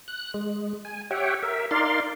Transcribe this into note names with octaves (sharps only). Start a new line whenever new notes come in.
F#6
G#3
G#5
G4 C#5 E5 F#5 G5
A#4 E5
D#4 A#4 D5 F5 C6